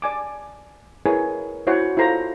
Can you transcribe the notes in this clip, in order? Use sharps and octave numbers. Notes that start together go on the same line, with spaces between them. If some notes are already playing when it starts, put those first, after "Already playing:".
D5 G#5 D6
E4 G#4 A#4 B4 C#5 G#5
E4 F#4 C5 C#5 F#5
E4 F4 A4 C5 A#5